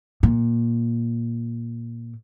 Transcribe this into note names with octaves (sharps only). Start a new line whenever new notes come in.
A#2